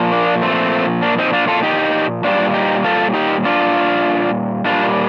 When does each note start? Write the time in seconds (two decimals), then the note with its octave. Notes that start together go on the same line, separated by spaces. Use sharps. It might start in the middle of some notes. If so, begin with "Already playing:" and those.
Already playing: A#2 F3
0.12 A#3 D4
0.42 A3 C4
1.02 A#3 D4
1.18 C4 D#4
1.33 D4 F4
1.48 F4 A4
1.63 D#4 G4
2.24 A#2 G3 D4 F4
2.54 D#4 G4
2.84 F4 A4
3.14 D#4 G4
3.45 D4 F4
4.65 A#2 G3 D4 F4